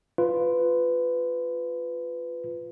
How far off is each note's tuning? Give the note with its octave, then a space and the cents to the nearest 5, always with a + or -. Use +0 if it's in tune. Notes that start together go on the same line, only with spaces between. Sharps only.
F4 +0 B4 +15